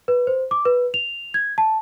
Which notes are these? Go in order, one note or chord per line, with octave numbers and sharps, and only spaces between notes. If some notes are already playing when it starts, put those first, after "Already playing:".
B4
C5
D6
B4
F7
G#6
A5